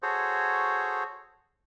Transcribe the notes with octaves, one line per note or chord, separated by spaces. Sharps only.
F#4 G#4 A4 C5 C#5